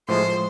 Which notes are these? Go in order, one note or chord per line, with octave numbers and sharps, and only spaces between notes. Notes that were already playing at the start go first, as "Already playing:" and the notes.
A2 F3 G#3 C5